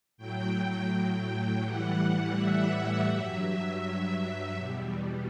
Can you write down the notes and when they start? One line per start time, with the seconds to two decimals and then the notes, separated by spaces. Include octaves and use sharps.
0.17 A2 F#3 G5
0.91 G5
1.64 A2 E3 G3 F#5
2.36 E5
3.10 G2 F#3
4.55 E2 B2 G3